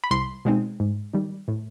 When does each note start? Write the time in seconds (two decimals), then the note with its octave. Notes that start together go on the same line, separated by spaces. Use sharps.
0.04 B5
0.11 C2 C6
0.45 B2 G#3 C4 D#4
0.80 G#2
1.13 D#3 G3
1.48 A2